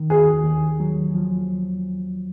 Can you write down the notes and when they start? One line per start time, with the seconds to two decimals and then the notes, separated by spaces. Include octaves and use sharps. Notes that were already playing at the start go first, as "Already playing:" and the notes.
Already playing: D#3
0.10 D#2 G#4
0.44 D#2
0.80 F#3
1.15 F3